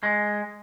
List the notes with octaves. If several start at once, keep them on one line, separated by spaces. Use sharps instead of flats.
G#3